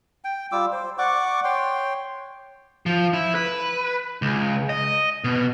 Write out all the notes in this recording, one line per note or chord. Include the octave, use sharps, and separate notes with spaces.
G5
G3 F4 D6 E6
C5
D5 F#5 C#6 D6
C#5 G5 C6
F3
E4
B4
C#2
D#5
B2